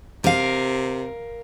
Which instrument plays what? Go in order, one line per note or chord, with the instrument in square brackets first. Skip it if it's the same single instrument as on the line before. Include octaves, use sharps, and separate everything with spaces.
[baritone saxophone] C3 [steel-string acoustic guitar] A#4 F5